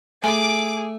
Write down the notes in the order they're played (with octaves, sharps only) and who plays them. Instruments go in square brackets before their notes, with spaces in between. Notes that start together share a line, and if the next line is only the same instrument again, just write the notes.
[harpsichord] A3 [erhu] G#4 [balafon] G#5 [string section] D6